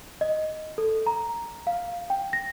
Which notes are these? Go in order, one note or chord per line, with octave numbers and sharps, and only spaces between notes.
D#5
A4
A#5
F5
G5
A#6